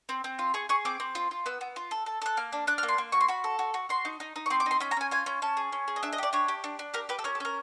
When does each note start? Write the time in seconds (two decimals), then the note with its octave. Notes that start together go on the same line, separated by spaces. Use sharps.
0.09 C4
0.24 C4
0.39 F4
0.54 G#4 C#6
0.69 G#4 C#6
0.85 C4 D6
1.00 C4
1.15 F4
1.31 F4
1.46 B3 E6
1.61 B3
1.76 F4
1.91 A4
2.06 A4
2.22 A4 F#6
2.37 A#3 F6
2.52 D4
2.67 D4 F#6
2.78 F6
2.83 A#3
2.88 C6
2.98 A#3
3.12 F#4 C#6
3.21 C6
3.28 F#4 B5
3.44 A4
3.59 F#4
3.74 F#4
3.89 F#4 C6
4.05 D#4
4.20 D#4
4.36 D#4
4.46 C#6
4.50 C4 C6
4.60 D6
4.66 D#4 C6
4.80 C#4 B5
4.91 A#5
4.97 C#4 G#5
5.11 F4 G#5
5.26 C#4
5.42 C#4 A5
5.57 G#4
5.72 C#4
5.88 G#4
5.96 D#5
6.03 D4 E5
6.13 D#5
6.18 G4 D5
6.33 D4 C#5
6.48 G4
6.64 D4
6.79 D4
6.94 G4 A#4
7.09 G4 B4
7.19 A4
7.24 C#4 A#4
7.35 A4
7.40 C#4 A#4